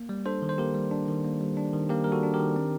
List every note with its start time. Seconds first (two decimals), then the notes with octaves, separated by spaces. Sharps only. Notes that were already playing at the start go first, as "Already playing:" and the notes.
Already playing: A#3
0.09 G3
0.25 D4 A4 C5
0.42 D#3
0.49 C5
0.58 A#3 G4 A#4
0.75 G3
0.91 D4
1.08 D#3
1.25 A#3
1.41 G3
1.57 D4
1.73 D#3
1.90 A#3 G4 A#4
2.04 G3 A#4
2.12 F#4 A4
2.23 D4
2.34 G4 A#4
2.39 D#3
2.56 C4